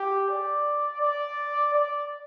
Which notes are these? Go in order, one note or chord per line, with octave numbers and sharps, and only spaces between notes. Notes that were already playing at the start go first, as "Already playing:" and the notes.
Already playing: G4
D5
D5
D5